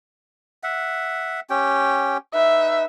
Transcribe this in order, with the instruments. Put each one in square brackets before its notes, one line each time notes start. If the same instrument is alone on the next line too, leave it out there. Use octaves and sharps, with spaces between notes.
[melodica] E5 F#5
C#4 G4 G5
[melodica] D#4 B4 [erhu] E5